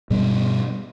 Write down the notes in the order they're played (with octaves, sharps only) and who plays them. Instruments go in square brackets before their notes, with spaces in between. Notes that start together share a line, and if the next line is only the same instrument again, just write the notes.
[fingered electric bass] G2 B2 G3